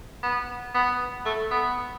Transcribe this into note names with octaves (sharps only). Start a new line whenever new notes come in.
B3
B3
A3
B3